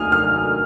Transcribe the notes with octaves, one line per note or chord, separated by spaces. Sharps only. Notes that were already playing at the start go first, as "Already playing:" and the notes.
Already playing: F1 D#2 D#3 F#3 A#3 G#5 D#6 F6
F6